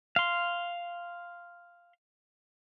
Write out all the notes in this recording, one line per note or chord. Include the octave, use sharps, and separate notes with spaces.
F5 C6